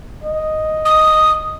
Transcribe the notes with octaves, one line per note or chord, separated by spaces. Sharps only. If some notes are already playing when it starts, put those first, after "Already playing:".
D#5
D#6